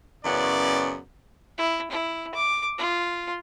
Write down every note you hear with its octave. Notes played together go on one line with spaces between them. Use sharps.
F#2 C#3 E3 B3 D5
E4
E4
D6
F4